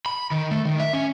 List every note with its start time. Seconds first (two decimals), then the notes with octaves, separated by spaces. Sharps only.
0.06 B5
0.31 D#3
0.51 A3
0.65 D#3
0.80 E5
0.93 C#4